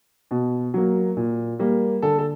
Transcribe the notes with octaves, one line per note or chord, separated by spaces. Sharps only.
B2
F#3 A#3
A#2
G3 A#3
D3 A4
A4